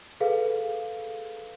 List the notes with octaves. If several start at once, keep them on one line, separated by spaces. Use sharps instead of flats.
G#4 A4 B4 F5